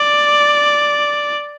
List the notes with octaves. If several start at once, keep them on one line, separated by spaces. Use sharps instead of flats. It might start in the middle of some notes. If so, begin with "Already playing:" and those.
Already playing: D5